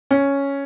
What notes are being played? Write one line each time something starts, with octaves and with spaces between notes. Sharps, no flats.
C#4